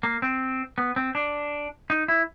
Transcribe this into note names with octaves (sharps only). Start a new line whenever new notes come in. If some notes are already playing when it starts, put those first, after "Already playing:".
A#3
C4
B3
C4
D4
D#4
E4